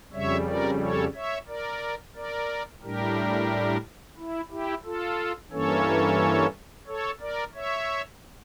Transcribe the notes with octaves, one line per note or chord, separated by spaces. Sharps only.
F2 C#3 G3 C#5 E5
A#4 D5
A4 C#5
C#5 E5
A#4 D5
A#4 D5
A2 G3 D4 G4 A#4
E4
E4 G4
F4 A4
G2 E3 A#3 C#4 A4 C#5
A4 C#5
A#4 D5
C#5 E5